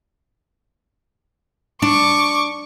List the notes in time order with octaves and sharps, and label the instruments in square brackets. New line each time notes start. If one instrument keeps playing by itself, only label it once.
[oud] D4 [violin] C#6 D6